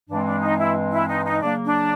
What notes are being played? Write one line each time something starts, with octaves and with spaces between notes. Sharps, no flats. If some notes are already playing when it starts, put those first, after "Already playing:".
G2 E3 G#3 C4 D4
D4
D#4
E4
E4
D#4
D#4
C#3 F#3 A#3 D4
D4